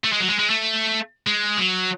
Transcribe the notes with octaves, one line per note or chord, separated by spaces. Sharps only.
A3
G#3
F#3
G#3
G#3
A3
G#3
F#3